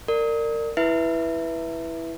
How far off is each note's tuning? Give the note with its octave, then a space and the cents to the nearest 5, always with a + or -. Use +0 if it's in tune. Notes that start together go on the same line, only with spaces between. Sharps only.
A#4 -25 D5 +15
E4 +0 B4 -10 E5 +0